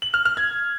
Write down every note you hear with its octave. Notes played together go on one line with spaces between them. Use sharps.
F#7
F6
F6
G#6